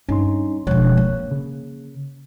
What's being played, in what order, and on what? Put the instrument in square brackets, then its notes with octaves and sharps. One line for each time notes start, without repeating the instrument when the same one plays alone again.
[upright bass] G2 [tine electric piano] C#4 D#4 C6
[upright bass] E1 F3 [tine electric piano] C#5 F#6
[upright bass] A#3
[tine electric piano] C#3